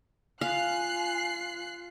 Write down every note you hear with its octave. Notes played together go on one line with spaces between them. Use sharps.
F4 F5 G#5 F#6 C7